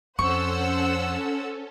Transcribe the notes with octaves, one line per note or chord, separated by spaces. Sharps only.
F2 C#4 A4 C5 F#5 C#6 E6